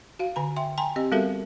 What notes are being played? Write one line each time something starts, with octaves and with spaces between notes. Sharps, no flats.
F#4 F5
D3 G#5 A#5
E5 G5 C6
G5 G#5 A#5 C6
C4 G4 D#5
G3 B3 F#4 A4 A#4 E5